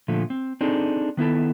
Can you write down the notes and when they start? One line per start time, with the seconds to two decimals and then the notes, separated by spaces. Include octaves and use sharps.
0.08 A#2 D3 F3 A3
0.30 C4
0.61 C4 D4 D#4 G#4 A4
1.17 D#3 B3 E4 A4